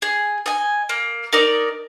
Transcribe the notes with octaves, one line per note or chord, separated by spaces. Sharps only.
G#4
D#5 G#5
A#3
D#4 A#4 D5